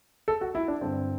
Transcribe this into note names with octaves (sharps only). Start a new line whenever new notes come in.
A4
F#4
E4
D4
G2 D3 C4